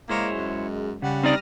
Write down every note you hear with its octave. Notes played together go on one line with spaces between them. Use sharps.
G#3 A#3 E4 C5 C#5
F#2
C#3 G3 F#5
C4 D#4 D5 D#6 F6 A#6